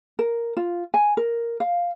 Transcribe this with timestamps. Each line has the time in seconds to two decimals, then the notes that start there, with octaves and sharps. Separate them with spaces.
0.19 A#4
0.57 F4
0.94 G#5
1.17 A#4
1.60 F5